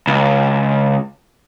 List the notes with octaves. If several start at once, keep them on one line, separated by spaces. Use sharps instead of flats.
C#2